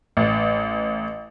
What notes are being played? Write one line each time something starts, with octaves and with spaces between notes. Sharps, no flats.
A1